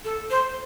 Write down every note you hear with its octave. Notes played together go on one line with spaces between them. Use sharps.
A4
C5